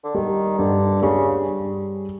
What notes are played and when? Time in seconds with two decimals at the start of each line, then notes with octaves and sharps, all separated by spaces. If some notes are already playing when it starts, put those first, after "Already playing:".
0.04 D3
0.15 D#3 G3
0.58 G2 D3
1.03 C#3 G3